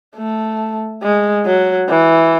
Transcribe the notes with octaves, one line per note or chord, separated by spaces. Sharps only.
A3
G#3
F#3
E3